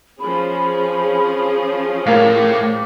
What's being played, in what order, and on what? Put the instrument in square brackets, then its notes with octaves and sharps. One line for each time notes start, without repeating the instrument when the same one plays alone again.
[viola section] F3 C#4 G#4 [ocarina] B5
[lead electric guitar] A2 [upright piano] A#4 F5 [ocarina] D6